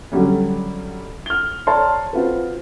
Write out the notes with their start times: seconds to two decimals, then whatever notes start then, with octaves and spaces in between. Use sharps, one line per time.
0.12 D3 F#3 G3 C#4
1.26 F6 G7
1.67 C#5 D5 A5 A#5 C6
2.13 C4 F4 F#4 B4